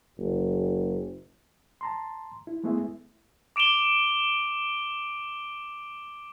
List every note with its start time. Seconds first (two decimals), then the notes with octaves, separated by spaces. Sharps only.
0.18 F#1
1.81 A5 A#5 C6
2.47 E4
2.64 G#3 A3 B3 E4 G#4 E5
3.56 D6 D7 E7 F7 G7